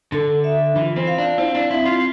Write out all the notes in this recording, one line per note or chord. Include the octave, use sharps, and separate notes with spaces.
D3 A4
E5
E3 F4
C4
F5
D4
C4 E4
D4
C4 E4
F4